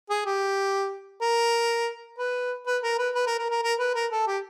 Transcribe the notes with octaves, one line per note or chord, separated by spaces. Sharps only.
G#4
G4
A#4
B4
B4
A#4
B4
B4
A#4
A#4
A#4
A#4
B4
A#4
A4
G4